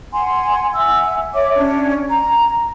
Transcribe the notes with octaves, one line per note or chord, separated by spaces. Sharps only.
F#5 G#5 C6
E5 F#5 G#5 E6
C#5 E5 D6
C#4 D4 G4
A#5